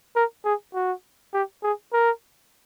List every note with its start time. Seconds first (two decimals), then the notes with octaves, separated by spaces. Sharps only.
0.16 A#4
0.45 G#4
0.74 F#4
1.33 G4
1.63 G#4
1.93 A#4